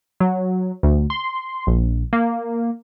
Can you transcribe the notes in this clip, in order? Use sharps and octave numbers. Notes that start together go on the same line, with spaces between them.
F#3
D2
C6
A#1
A#3